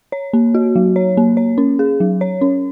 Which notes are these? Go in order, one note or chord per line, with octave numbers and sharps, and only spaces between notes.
C#5
A#3
F#4
F#3
C#5
A#3
C#5
C#4
G#4
F#3
C#5
C#4